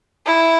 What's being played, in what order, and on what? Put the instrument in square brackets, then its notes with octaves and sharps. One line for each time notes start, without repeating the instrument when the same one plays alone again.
[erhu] E4